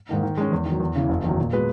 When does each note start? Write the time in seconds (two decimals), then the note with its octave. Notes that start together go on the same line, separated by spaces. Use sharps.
0.09 G#2 D#3 A#3 D#4
0.23 D#3
0.37 G#3 C#4
0.52 E2
0.66 D#3 F#3
0.80 E2
0.96 C#3 E3
1.09 F#1
1.24 E2 D#3 F#3
1.38 A#2
1.52 G#3 B3 F#4 B4